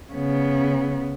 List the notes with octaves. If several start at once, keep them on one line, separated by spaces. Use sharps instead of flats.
C#3 B3